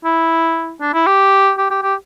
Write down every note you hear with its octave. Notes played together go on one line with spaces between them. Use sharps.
E4
D4
E4
G4
G4
G4
G4